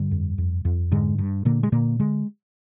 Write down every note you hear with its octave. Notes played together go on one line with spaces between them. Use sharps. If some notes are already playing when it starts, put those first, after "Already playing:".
Already playing: G2 D3 G3
F2
F2
F2
G#2 D3 G#3
G2
A#2 D3 A#3
G#3
A#2 D3 A#3
D3 G#3